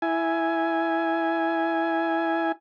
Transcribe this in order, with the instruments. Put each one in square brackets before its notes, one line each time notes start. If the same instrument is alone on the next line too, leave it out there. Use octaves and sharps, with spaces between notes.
[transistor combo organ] E4 G#5